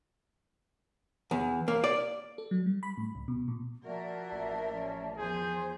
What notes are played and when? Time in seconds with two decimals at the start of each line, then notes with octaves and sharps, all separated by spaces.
1.31 E2
1.68 A#3
1.84 D5
2.38 A4
2.51 F#3
2.66 G3
2.83 B5
2.98 A2
3.15 C#2
3.28 B2
3.48 A#2
3.85 F3 A#3 F#4 A#4 D5 E5 A5
4.32 A1
4.75 C#4
5.17 E2 F3 G#4 C5 G6